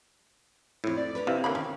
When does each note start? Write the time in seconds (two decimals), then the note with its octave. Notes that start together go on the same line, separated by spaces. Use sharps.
0.84 F2 A2 E4
0.97 D5
1.15 C#4 D4 B4
1.27 C3 E4 F4
1.44 D3 A#3 C#4 B5
1.55 D#3 C#4